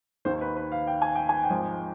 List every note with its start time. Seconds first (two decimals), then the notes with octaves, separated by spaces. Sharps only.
0.25 D#2 D#3 C5
0.41 B4
0.57 B4
0.72 F5
0.87 G5
1.02 G#5
1.15 G5
1.29 G#5
1.44 G5
1.50 G#1 G#2 F3